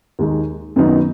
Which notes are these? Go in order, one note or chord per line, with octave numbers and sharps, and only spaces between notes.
D#2 D#3 G#3 D#4
F#2 D#3 F#3 B3 D#4